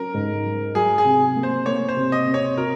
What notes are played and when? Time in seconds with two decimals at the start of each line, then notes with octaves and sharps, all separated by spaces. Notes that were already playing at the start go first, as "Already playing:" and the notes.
Already playing: F#3 C#4 A#4
0.14 G#2
0.44 F#3
0.75 F#3 G#4
0.98 G#4
1.05 C3
1.36 A#3
1.43 C5
1.66 A#3 C#5
1.89 C5
1.97 C3
2.12 D#5
2.27 C3
2.34 C#5
2.57 F#4 A#4